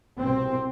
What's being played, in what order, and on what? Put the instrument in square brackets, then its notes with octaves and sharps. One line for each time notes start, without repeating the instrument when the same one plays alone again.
[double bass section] C2 B2 C4